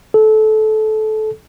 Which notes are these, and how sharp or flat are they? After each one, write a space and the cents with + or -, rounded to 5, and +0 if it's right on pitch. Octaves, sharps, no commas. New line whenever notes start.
A4 -20